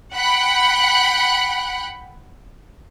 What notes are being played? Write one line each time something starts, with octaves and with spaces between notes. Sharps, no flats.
F#5 G5 B5 F#6